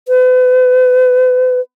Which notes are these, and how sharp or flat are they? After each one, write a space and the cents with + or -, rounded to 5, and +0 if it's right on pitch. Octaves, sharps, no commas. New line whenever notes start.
B4 +40